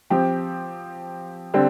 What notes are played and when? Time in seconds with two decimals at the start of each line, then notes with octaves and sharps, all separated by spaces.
0.10 F3 C4 G4
1.54 D3 G3 C4